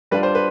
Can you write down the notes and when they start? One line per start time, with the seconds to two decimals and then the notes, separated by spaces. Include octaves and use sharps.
0.11 G3 D4 F4 B4
0.23 C5
0.35 B4